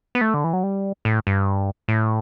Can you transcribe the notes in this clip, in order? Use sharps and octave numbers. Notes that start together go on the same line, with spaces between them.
B3
A3
D3
E3
F#3
G3
A2
G2
A2